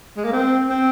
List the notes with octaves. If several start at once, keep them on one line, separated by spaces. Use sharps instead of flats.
G#3
A#3
C4
C4